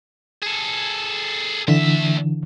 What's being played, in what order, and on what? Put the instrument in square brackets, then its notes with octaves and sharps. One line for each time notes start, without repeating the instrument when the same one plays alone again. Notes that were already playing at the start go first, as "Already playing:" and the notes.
[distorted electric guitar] G#4 A4
[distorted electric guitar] D2 E5 [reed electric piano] D3 E3